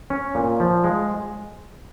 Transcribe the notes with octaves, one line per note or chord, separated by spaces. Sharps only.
C#4
A#2
F3
G#3